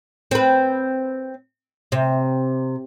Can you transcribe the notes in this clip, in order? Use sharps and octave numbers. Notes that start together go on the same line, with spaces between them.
C4 B4
C3